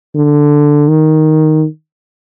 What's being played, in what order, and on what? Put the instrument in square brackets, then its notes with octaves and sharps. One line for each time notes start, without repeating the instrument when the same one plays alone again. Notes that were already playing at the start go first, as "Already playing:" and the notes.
[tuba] D3
D#3